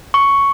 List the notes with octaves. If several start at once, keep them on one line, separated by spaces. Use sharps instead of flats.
C#6